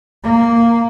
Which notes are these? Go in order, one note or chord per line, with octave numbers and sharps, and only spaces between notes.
A#3